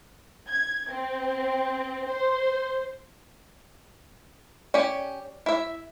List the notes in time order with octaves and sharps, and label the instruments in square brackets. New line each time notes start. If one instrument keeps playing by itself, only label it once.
[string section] G#6
C4
C5
[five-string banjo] C#4 G4 [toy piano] D5
[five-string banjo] E4 E5